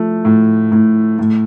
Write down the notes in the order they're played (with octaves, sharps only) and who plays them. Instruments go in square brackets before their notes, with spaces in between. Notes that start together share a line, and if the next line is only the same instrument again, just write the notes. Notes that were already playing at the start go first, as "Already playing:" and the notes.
Already playing: [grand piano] F3 A3
A2
A2
A2